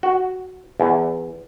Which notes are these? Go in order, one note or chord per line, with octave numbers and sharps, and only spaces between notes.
F#4
E2